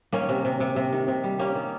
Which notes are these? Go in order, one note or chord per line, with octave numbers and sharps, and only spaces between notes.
D#3 A#3 C#4
C3
C3
C3
C3
D#3
C3
G3
G3 A#3 C#4
D#3